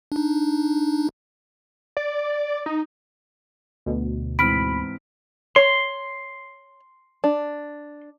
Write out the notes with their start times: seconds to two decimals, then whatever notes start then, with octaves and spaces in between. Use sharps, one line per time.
0.12 D4 D#4
1.97 D5
2.66 D#4
3.86 D2 B2
4.39 G#2 E3 C4 B5 F6 B6 D7
5.56 C#5 C6
7.24 D4